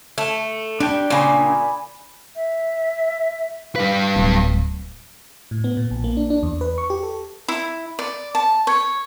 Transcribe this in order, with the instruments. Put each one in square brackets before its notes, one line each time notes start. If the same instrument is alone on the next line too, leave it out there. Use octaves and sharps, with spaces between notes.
[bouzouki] A3
[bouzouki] G3 [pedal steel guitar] D4 G5
[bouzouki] A#2 C#3 [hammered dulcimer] D5 G#5 B5
[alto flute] E5
[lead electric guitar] G3 B4 [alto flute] F5
[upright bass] D1
[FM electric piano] A2
B3
A#2
A#1
A#3
D4
D4
E2
B4
C#6
G4
A4
[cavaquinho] E4
D5
A5
C#5